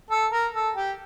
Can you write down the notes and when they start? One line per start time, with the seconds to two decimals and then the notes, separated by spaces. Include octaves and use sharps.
0.10 A4
0.31 A#4
0.54 A4
0.76 G4